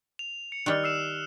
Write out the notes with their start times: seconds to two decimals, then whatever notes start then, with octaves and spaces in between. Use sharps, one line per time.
0.19 F7
0.52 C#7
0.66 D#3 G3 F6 F#6
0.84 E6 C7 E7